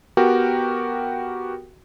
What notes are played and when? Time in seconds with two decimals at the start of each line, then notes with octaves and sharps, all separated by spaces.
0.17 B3 F#4 G4 A#4 G5